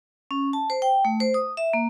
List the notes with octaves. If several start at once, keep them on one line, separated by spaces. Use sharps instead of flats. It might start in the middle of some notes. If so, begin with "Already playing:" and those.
C#4
A5
C5
G5
A3
C5
D#6
E5
A#3